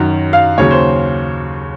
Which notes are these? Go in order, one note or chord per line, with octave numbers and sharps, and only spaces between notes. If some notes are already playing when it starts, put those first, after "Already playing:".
Already playing: F#2 D#3 F#3
F5
D#2 C#3 F#3 C#5
C5